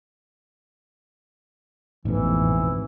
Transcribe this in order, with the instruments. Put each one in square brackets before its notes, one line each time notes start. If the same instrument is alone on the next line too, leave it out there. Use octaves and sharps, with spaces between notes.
[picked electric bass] A1 B2 [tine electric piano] F2 G#2 [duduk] E3